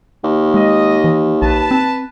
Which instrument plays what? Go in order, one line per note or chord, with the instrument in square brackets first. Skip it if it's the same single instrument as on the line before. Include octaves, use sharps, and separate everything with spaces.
[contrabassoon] D#2
[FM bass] G#3 [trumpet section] D#5
[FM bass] E3
[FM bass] A#1 [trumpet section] B4 A5
[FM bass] C4